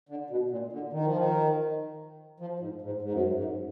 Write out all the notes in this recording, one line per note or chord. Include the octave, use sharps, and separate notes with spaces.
D3
B2
A#2
D3
D#3
F3
D#3
F3
G#2
G#2
G#2
F#2
G#2
F#2